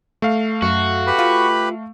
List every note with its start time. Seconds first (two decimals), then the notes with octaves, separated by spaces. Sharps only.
0.22 A3 F5
0.62 F#2 F#4
1.07 G4 B4 B5
1.19 F4